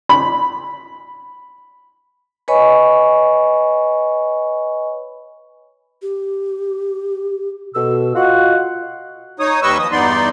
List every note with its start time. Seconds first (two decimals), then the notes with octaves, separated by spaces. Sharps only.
0.09 B5
2.48 B4 C#5 D#5 G#5 B5 C#6
6.02 G4
7.75 B2 A4 E6
8.16 F4 F#4 D#5 F#5
9.40 D#4 C#5 D#6
9.62 D#2 G3 B4 D#5 C#6 E6
9.79 F3 D#6
9.92 E2 G2 B3 D#4 D5 C6